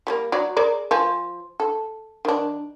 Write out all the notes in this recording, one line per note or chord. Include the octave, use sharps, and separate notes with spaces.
G3 A3 A#3
F#3 D5
G#4 A#4 D5
F3 C5 G#5
A4
D#3 D4